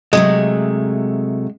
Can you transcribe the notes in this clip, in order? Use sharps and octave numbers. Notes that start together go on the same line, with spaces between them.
C3 F#3 G#3 A3